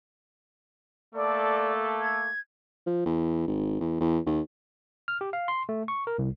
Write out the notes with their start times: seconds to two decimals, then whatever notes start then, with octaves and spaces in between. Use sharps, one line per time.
1.15 A3 A#3 A4 D5
2.00 G#6
2.86 F3
3.06 E2
3.47 G#1
3.80 E2
4.01 E2
4.26 D#2
5.08 F6
5.21 G4
5.33 F5
5.48 C6
5.69 A3
5.88 C#6
6.07 A#4
6.19 C2